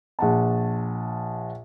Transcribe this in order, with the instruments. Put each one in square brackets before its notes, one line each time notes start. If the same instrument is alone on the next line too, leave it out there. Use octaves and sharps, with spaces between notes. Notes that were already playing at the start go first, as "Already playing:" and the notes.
[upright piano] A#1 F#5 A5